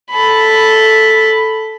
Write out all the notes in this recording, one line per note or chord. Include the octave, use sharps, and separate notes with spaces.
A4 B5